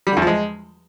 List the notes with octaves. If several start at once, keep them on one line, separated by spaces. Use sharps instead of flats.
G3
D3
E2
F3
G#3